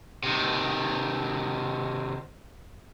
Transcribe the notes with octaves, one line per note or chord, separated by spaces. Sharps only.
C3 D#3